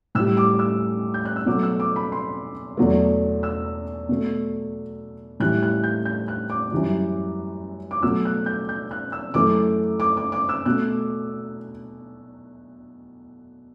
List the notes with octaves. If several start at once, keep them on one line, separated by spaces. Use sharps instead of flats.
A2 G3 E6
D6
E6
G6
F#6
E6
B2 F#3 A3 D6
E6
D6
B5
C6
E2 B2 F#3 A3
E6
B2 A3
A2 E3 G3 F#6
F#6
G6
G6
F#6
D6
F#2 E3 G3
D6
B2 F#3 A3 E6
F#6
G6
G6
F#6
E6
F#2 E3 A3 D6
D6
D6
D6
E6
B2 A3 F#6